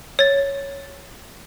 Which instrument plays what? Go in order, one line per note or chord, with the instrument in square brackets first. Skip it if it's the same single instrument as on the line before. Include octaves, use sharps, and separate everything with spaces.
[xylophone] C#5 A6